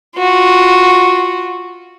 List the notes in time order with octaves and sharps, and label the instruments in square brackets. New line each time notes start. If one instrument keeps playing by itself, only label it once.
[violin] F4 F#4